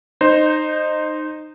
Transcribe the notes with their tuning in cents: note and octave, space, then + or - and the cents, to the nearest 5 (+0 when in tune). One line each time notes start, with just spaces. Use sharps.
D#4 -15 C5 +0